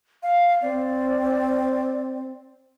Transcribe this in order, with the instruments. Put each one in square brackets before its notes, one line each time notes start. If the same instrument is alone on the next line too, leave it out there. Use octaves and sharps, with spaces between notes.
[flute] F5
[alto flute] C4 [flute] D5